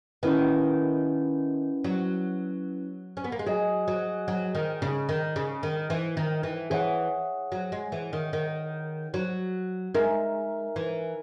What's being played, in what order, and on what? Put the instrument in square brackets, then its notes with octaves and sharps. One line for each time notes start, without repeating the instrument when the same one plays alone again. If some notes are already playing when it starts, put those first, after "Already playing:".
[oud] D#3 [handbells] C#4 E4 B4 F#5
[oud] F#3
C#4
B3
A#3
G#3
[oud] F#3 [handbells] G#4 D#5 G#5
[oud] F#3
F#3
D#3
C#3
D#3
C#3
D#3
E3
D#3
E3
[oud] E3 [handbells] G#4 C#5 F#5
[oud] F#3
G#3
E3
D#3
D#3
F#3
[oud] G#3 [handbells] D#4 A#4 E5 G#5
[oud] E3